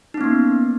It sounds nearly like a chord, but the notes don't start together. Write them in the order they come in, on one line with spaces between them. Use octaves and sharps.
D#4 C#4 B3 A#3